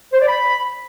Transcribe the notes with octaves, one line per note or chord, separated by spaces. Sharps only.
C5
D5
B5